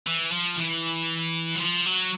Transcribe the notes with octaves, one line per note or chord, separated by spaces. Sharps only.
E3
F3
E3
F#3
F3
F#3